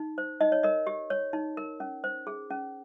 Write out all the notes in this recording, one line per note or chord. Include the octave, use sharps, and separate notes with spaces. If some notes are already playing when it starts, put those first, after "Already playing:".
Already playing: D#4
C5
D#4 D#5
C#5
A#4 D#5
G4
C#5
D#4
A#4
C#4
C5
G#4
C#4